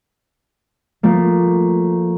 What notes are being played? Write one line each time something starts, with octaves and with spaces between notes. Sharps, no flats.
F3 A3 A#3